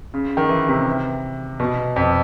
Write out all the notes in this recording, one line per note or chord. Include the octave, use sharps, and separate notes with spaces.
C#3
D#3
E3
C3
B2
F2